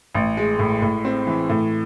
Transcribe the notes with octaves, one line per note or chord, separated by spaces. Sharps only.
A1
G#3
A2
A2
C4
E3
A2